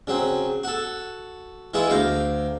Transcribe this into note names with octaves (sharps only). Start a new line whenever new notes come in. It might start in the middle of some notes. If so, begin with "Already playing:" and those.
C#3 F#3 C4
F#4 A4
E3 G#3 E4 F4
D2 F5 G5 A#5